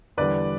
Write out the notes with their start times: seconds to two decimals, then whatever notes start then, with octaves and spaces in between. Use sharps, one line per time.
0.17 E2 D3 G3 B4 D5